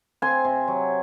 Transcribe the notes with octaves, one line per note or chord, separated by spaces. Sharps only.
C4 G#5 C6
C3
F#3